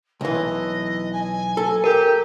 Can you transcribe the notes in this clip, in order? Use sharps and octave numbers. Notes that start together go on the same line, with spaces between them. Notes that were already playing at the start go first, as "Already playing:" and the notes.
B1 E3 D#5
G#5
A4
G4 A#4